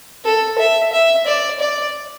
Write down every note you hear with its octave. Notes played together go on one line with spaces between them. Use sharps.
A4
E5
E5
D5
D5